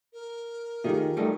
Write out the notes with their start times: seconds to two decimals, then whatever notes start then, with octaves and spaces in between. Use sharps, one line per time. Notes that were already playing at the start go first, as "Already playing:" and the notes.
0.13 A#4
0.84 D#3 A3 D#4 F4 G4 G#4
1.17 G3 A3 D#4